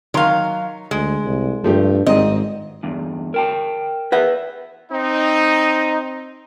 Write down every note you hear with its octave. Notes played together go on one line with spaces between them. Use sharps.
D#3 F#3 F5 C6
D2 G#3
C2
G2 F3 A3 G4
G#1 G#2 C4 D#5
E2 G2
A#4 G5 A5
B4 E5 F#5
C4 D#4